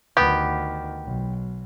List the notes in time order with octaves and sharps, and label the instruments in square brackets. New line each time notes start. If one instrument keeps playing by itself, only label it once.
[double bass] D2 D#3 [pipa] B3 G4
[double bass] B1